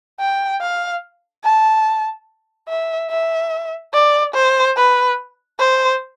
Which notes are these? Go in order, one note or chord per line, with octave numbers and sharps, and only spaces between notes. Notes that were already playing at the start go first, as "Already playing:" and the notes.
G5
F5
A5
E5
E5
D5
C5
B4
C5